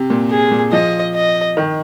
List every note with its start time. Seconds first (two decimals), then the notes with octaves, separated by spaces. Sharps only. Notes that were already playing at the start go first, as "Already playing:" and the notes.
Already playing: C3
0.10 A#2
0.31 G#4
0.51 A#2
0.72 F3 D#5
1.15 D#5
1.57 D#3